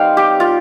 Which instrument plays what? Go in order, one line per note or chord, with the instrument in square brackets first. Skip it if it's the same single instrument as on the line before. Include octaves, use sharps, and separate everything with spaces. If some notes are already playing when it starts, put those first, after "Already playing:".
Already playing: [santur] G3 C4 D#4 F5 G5
G4
F4